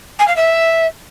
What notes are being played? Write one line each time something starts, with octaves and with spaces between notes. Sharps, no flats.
G#5
F5
E5